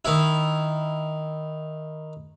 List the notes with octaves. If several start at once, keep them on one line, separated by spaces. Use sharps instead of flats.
D#3 E4